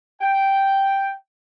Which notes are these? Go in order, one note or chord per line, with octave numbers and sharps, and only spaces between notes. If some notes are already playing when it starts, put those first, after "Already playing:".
G5